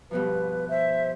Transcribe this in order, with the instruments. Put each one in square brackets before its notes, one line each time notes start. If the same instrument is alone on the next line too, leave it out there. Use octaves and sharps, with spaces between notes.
[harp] G2 B2 F3 [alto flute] B4
[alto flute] C5 [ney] E5